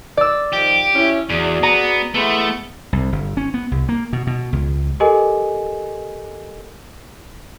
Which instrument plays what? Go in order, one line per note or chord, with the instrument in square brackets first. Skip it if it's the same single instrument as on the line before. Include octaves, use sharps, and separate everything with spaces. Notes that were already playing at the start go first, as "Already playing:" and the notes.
[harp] D5 E6
[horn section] D#3 F3 [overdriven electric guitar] G4
[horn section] C#4 E4
[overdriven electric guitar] E2 [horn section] F#4 G#4 D5
[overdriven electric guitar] B3 [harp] A#5
[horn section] E3 G#3 B3 [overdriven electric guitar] A3
[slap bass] C2
G1
C#4
B3
C2
A#3
B2
B2
C#2
[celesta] G4 A4 A#4 D#5 G#5